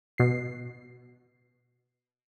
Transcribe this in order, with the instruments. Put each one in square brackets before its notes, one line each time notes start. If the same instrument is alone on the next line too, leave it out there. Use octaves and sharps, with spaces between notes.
[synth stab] B2 C7